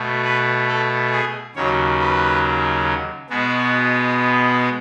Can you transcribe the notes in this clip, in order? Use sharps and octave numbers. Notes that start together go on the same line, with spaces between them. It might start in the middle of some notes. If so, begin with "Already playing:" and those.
Already playing: B2 A3
B4
A4
G#4
D#2 C#3 F#3 C#5
B4
B2 G#3 B3 F#4